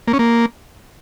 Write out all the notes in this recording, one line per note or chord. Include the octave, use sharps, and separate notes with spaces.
A#3
C#4
A#3